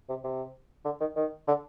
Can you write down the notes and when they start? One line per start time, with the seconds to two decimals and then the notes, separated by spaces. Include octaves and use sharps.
0.09 C3
0.24 C3
0.85 D3
1.00 D#3
1.16 D#3
1.47 D3